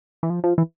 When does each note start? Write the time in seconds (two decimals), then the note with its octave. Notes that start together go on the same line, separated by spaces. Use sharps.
0.23 E3
0.30 F3
0.44 F3
0.58 E3